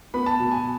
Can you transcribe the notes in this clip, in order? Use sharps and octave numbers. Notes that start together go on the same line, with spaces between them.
B3 B5
A5
B2
G#5